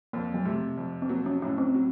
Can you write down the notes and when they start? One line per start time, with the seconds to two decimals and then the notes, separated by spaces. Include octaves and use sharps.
0.13 F2 A#3
0.34 F#3
0.45 C3 A3
0.77 F2
1.02 C4
1.09 F#3 A#3
1.26 C#4
1.42 A2 C#4
1.58 C4
1.74 F#3